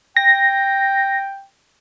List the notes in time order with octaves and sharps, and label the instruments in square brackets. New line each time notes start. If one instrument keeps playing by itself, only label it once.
[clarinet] G5 [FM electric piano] A#6